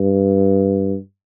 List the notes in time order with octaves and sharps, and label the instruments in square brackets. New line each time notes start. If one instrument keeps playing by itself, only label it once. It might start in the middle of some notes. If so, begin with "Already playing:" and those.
Already playing: [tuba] G2